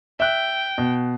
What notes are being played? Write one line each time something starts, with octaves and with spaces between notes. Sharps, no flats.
E5 G5 F#6
B2